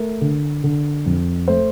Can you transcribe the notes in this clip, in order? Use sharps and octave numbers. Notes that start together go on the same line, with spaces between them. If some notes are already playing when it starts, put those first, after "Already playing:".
Already playing: A3 A#4
D3
D3
F2
A3 C5